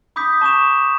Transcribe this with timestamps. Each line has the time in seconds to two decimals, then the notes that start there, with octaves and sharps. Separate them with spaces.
0.16 B5 D6 D#6 G6 B6
0.41 A5 C#6 D6 E7